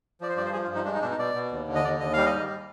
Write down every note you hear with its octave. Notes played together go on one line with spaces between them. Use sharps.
F3 D5
C5
G2 D5
C5
F3 G#4
F4
G2
D#4
G#3 D4
D#4
B2 D4
D#4
B2 D5
B2
D#2
D3
D#5
D#2 D5
D#2 D#5
G3 F5
D#5
G#2